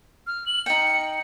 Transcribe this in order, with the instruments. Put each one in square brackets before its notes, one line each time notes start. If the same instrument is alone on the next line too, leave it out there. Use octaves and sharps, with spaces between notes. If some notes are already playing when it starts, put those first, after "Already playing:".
[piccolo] F6
F#7
[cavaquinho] D#4 G5 [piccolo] C#7